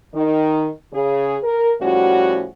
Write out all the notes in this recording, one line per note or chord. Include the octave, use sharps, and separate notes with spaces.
D#3 D#4
C#3 G#4
A#4
A2 F3 G3 C#4 F#4